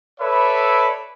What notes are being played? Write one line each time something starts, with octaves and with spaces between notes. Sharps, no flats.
A4 B4 C#5 D5 E5 B5